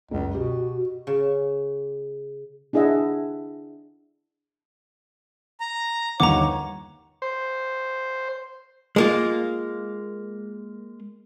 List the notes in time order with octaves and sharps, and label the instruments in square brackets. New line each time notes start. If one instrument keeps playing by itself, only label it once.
[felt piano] F#1 [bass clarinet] C#2
[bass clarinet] B2 [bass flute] F#4 [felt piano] G4
[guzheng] C#3
[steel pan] D4 E4 G#4 D#5 E5 F#5
[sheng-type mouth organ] A#5
[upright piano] G1 D#2 F#5 [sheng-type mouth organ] C#5 [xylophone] A#5 D6
[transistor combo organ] C5
[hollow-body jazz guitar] G#3 A#3 F4